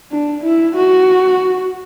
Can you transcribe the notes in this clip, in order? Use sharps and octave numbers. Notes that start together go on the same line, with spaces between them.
D4
E4
F#4